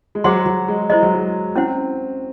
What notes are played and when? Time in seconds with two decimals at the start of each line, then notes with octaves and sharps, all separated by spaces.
0.15 G#3
0.24 F#3 G#4 C5 F#5 C6
0.46 F#3
0.68 G#3
0.90 G#3 E4 C5 D#5
1.03 F#3
1.14 G#3
1.55 C4 C#4 E4 C5 F#5